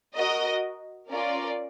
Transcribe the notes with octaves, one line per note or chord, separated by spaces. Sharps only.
F#4 A#4 D#5
C#4 F4 A#4 D5